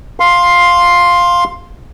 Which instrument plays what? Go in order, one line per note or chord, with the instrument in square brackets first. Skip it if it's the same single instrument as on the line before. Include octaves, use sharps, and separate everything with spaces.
[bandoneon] F5 C6